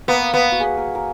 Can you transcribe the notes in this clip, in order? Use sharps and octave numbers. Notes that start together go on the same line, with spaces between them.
A#3 B3
B3
F#4
G#4
A#4
A#4